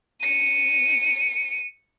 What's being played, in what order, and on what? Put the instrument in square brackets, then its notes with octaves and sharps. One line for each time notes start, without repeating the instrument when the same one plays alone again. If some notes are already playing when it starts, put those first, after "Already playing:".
[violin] C#7 D#7